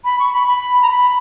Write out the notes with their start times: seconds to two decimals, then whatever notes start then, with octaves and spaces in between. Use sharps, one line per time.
0.05 B5
0.19 C#6
0.33 B5
0.48 B5
0.82 A#5
0.90 B5